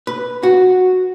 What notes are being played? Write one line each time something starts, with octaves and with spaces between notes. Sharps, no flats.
B4
F#4